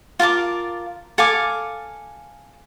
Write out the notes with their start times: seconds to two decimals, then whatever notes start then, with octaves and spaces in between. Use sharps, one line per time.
0.19 F4 A#4 A5 D6
1.18 A4 F5 G#5 D6